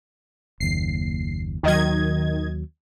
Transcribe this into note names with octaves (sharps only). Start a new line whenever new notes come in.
F#1 D#2 C7
D#2 D#3 F#3 D#5 G#6